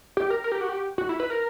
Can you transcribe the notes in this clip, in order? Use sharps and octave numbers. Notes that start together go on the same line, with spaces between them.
G4
A#4
A#4
G4
F#4
G4
F#4
E4
B4
A#4